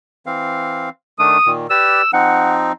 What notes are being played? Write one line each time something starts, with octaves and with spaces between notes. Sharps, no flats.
E3 C4 F5
D#3 A3 D4 D#6
A#2 D#3
G4 B4 D5 E6
F3 C4 D#4 F#5